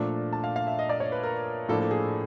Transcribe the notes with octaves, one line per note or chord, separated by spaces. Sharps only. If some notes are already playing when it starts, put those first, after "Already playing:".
Already playing: A#2 F3 A3 D4
A5
F5
F5
E5
D#5
D5
C#5
B4
A#4
A2 F3 A#3 D4 A4
A4
G#4